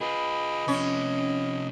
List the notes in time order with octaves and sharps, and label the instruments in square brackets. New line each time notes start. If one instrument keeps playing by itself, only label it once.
[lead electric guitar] F4 G#4 [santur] B4 [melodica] D#5
[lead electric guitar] C3 F3 [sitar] C#4